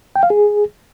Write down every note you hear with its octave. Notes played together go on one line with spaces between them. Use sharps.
G5
F5
G#4